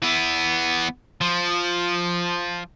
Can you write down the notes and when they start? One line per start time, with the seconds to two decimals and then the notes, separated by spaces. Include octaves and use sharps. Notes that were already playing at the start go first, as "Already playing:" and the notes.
0.02 E3 B3
1.21 F3